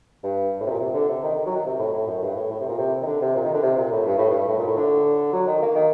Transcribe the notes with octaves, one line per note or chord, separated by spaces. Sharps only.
G2
A2
C3
A#2
C3
D3
C3
D#3
D#3
F#3
D#3
C3
A2
A2
F#2
G2
A2
A2
C3
A#2
C3
D#3
D3
C3
A#2
D#3
D3
C3
A#2
A2
G2
A2
G2
A2
A#2
A2
D3
F#3
D#3
A#3
D#3